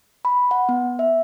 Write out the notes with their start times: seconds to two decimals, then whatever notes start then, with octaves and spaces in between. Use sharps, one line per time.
0.25 B5
0.51 F#5
0.69 B3
0.99 E5